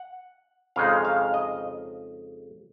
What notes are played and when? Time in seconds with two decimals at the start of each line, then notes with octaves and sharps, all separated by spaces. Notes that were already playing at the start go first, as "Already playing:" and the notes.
Already playing: F#5
0.76 F2 C#3 G#3 D#4 F5
1.05 F5
1.34 D#5